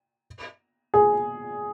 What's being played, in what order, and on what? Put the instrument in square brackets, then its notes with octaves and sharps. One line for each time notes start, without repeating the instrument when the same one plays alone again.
[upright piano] G#4